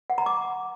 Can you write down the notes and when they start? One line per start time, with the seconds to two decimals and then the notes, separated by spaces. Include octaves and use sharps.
0.10 F#5
0.18 A#5
0.26 D6